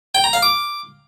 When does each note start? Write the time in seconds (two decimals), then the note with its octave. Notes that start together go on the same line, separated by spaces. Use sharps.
0.15 G5
0.24 A#5
0.33 F5
0.43 D6